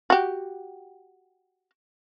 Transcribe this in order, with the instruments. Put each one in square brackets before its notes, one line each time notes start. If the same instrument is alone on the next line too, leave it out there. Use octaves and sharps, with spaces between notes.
[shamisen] F#4 G4